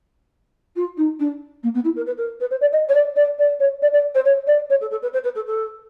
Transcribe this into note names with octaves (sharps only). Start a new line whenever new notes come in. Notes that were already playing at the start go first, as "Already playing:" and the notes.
F4
D#4
D4
A#3
B3
E4
A#4
B4
A#4
B4
C5
D5
D#5
C#5
D5
D5
D5
C#5
D5
D5
C5
C#5
D5
C#5
A4
A4
B4
C5
B4
A4
A4